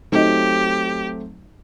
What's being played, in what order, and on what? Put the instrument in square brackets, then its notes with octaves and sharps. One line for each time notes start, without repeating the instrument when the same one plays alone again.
[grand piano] F#3 A3 C4 [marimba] D#4 D#5 [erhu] G4